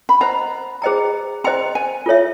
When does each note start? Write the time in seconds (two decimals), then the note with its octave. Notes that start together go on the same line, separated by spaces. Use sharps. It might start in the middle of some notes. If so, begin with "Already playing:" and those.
0.09 B5
0.21 C5 D#5 F#5 A#5
0.82 G#4 C5 D#5 G5 A#5
1.44 C5 D#5 G5 A#5 C6
1.75 G#5
2.06 F4 A4 C#5 E5